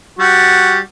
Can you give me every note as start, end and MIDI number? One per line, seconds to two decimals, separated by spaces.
0.19 0.79 55
0.19 0.79 66